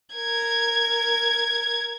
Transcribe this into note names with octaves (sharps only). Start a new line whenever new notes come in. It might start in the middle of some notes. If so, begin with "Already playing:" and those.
A#4 G#6